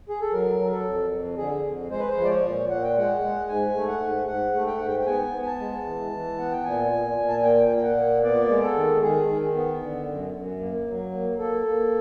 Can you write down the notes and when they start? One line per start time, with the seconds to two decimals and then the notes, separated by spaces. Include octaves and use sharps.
0.09 G#4
0.21 A4
0.32 F#3 A#4
0.59 F#3
0.71 A4
0.85 F2
1.11 F2
1.37 D3 G#4
1.64 F2
1.90 G#3 C5
1.99 B4
2.10 C5
2.17 F3
2.24 D5
2.30 C#5
2.43 A#2
2.69 A#2 F#5
2.83 G5
2.96 G#3 F#5
3.22 G#3
3.48 G#2 G#5
3.74 A3
3.88 F#5
4.01 G#2
4.27 G#2 F#5
4.54 A3
4.67 G5
4.77 G#2 F#5
4.88 G5
5.00 G5
5.06 B3 G#5
5.33 B3
5.42 G#5
5.46 A5
5.59 G#3
5.85 E3
6.11 E3
6.38 B3 F#5
6.51 G5
6.64 A#2 G#5
6.92 A#2
7.17 A#2
7.28 A5
7.37 G#5
7.43 A#3 G5
7.69 A#2
7.77 G5
7.83 F#5
7.96 A#3
8.23 B3 D5
8.49 G#3
8.62 A4
8.75 D#3
9.02 D#3 G#4
9.29 D#3
9.55 B3
9.82 D3
10.07 F#2
10.34 F#2
10.60 A#3
10.87 F#3
11.13 A#3
11.39 A#3 A4
11.66 A#3